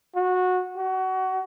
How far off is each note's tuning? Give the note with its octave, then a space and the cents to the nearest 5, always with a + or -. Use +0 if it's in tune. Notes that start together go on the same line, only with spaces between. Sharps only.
F#4 -15
F#4 +25